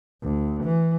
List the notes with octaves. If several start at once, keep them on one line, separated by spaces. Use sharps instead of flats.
D2
E3